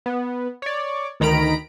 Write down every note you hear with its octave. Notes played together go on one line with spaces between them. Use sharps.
B3
C#5 D5
D2 D#3 A#5 B5 D7